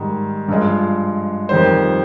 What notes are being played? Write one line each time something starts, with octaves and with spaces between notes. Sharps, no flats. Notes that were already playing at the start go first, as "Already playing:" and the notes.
Already playing: G#2 D#3 G3
G2 F3 G#3
F2 D#3 G3 C5